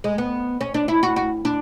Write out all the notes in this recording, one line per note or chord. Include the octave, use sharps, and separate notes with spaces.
G#3
B3
C#4
D4
E4
F#4
F#4
D4